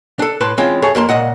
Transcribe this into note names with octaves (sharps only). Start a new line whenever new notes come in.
D4 A4
A2 B4 A5 C6
E3 G#3 C4 C#4 F4
F#2 G#4 A4 C#5
F2 A#3 A5 C6
C#2 A#2 D#5 F#5